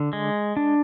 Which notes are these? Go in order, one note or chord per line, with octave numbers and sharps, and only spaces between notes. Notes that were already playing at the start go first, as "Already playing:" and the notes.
Already playing: D3
G#3
D4